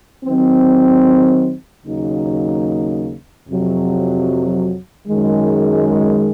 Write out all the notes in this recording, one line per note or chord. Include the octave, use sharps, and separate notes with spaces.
D#3 F#3 C4
D#2 C#3 F#3 A#3 D#4
F2 C3 F#3
F#2 D#3 G#3